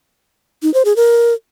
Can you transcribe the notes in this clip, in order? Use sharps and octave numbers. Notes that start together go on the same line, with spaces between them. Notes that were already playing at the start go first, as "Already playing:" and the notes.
D#4
C5
G#4
A#4